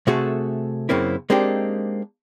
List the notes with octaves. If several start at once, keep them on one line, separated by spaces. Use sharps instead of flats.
C3 A3 F#4 G#4 A4
F#2 C#3 A#3 C4 E4
G#3 A#3 C4 D4 D#4 G4